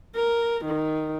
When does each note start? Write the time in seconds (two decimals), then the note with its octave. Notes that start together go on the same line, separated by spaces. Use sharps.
0.16 A#4
0.65 D#3